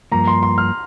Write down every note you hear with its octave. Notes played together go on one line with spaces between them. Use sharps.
G2 F3 A#3 A#5
C6
C6
F6